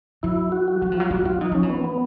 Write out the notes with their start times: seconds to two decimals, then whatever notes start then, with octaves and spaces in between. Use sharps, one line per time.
0.23 F#3 E4
0.52 F#4
0.68 F#4
0.82 F#3 F#4
0.92 F3
0.97 F#3 F4
1.11 G3 F#4
1.25 F#3 F4
1.41 E3 D#4
1.52 F3 C#4
1.63 E3
1.70 B3
1.84 B3